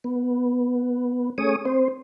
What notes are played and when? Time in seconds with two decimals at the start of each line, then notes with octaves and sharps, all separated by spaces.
0.04 B3
1.38 A3 C#4 G#4 C#5 D#6
1.65 C4 C5